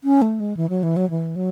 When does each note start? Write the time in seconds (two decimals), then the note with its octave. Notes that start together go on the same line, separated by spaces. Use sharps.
0.04 C#4
0.22 A3
0.40 G#3
0.57 E3
0.69 F#3
0.83 E3
0.96 F#3
1.10 E3
1.36 F#3